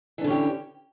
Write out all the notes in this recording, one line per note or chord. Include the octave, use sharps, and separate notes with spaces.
D3 E3 C#4 D4 G4